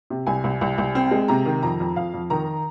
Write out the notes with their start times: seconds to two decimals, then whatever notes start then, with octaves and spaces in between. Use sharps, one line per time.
0.10 C3
0.27 C2 G#5
0.44 C2
0.61 C2
0.78 C2
0.95 C4
1.11 G#3
1.28 C3 A#5
1.45 D#3
1.63 F2 A#5
1.80 F2
1.96 F2 F5
2.14 F2
2.30 D#3 A#5